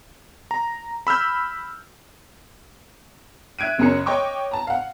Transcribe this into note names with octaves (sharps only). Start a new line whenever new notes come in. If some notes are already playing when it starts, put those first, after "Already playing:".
A#5
B5 E6 F6 G6
E5 F#6 G#6 D7 D#7
F#1 F#2 G#4 A#4 C#5 C#7
C#5 D#5 G5 C#6 D6
A5 A#5
F5 F#5